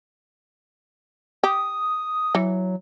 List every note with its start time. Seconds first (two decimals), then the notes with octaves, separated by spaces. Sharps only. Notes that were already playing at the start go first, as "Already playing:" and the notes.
1.44 G4 D#6
2.35 E3 F#3